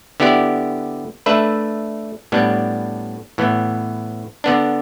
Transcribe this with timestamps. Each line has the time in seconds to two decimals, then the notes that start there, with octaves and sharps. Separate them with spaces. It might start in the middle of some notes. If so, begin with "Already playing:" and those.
0.20 D3 B3 E4 G4 D5
1.26 A3 D4 B4 E5
2.32 A2 G3 B3 D4
3.38 A2 E3 B3
4.44 D3 B3 D4